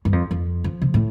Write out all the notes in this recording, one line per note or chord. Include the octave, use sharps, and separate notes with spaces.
G2
F2
F2
F3
C3
A2